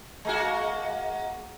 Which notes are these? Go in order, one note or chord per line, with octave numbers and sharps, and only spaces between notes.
G#3 A#3 F#4